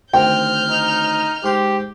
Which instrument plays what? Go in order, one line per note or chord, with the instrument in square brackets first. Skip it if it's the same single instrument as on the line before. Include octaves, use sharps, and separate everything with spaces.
[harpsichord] D2 D#3 C4 [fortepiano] G5 [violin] F6 G6
[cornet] D#4
[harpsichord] G#2 C6 [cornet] G4